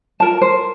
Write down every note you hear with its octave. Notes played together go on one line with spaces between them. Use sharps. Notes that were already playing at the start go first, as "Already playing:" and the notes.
F4 A#4 A5
C5